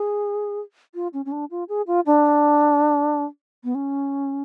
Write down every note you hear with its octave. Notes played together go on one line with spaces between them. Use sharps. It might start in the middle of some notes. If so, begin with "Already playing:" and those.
Already playing: G#4
F4
C#4
C#4
D4
F4
G#4
F4
D4
B3
C#4